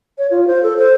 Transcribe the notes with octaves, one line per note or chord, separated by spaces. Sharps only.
C#5
F4
C5
A4
C5